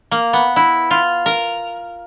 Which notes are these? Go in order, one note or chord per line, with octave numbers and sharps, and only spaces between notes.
A#3
B3
E4
F4
A#4